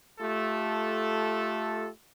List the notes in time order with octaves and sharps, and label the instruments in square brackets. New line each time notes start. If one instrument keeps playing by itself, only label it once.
[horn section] A3 F4 G4 A4